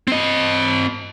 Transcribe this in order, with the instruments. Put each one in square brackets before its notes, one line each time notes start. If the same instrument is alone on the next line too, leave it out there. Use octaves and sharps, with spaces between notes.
[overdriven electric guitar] C4 D#5